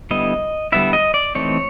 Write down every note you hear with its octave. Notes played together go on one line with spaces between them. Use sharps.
D3 G3 B3 E4 D#5
D3 G3 B3 E4 E5
D#5
D5
E3 A3 C4 D#4 C#5